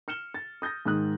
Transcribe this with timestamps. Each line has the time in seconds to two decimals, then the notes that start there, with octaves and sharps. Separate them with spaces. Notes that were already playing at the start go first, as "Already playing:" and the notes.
0.08 F6 C#7 E7 G7
0.34 A6
0.62 D#6 G6 A6 A#6
0.86 G#2 D#3 D#6 F#6